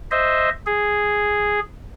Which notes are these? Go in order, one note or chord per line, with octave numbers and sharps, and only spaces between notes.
C5 D#5 E5
G#4